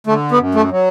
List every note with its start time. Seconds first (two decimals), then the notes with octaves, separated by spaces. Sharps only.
0.07 D3 A3
0.32 B3
0.38 F#2
0.55 A3
0.71 F#3